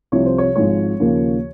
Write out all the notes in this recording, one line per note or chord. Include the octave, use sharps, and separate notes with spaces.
C2 C3 F3 C#5
C5
C#5
G#1 G#2 F3 G#3 C#5
D#2 C#3 F3 A#3